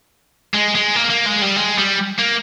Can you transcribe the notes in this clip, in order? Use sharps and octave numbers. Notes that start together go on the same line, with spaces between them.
G#3
G#3
A#3
A#3
G#3
G3
G#3
G3
A#3